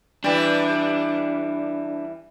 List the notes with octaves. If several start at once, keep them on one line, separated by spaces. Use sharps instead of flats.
E3 G3 D4